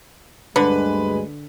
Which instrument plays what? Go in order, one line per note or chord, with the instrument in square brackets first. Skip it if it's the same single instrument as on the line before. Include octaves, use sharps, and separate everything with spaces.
[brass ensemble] D2 G2 G#3 [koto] D3 [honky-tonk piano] B4